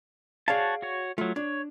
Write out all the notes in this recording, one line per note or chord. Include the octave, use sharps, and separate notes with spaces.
F#4 G#4 C#5 D5 F5 A5
F#4 C#5
F#3 A3 F4
D4 C#5